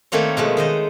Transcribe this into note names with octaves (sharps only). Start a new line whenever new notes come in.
D#3 A3 A#3 C4 C#5
B2 F3 G#3 A3
D#3 C5 D#5